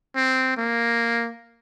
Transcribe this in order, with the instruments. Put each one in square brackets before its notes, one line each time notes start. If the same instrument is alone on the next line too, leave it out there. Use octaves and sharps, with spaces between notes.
[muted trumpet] C4
A#3